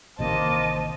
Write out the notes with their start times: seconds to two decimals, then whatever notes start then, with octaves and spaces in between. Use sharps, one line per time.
0.19 A1 C3 D#3 A#3 C5 D#5 A5